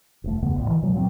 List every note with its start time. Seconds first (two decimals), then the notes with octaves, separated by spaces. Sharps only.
0.24 E1 A3
0.42 E2 C#3 A3 B3
0.56 A#1 A2
0.68 D#3 E3
0.82 B2 F#3 G#3
0.94 A#2 F#3 A3 C4